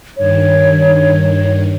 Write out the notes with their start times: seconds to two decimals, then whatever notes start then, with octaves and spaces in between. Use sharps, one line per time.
0.18 G2 D#3 C#5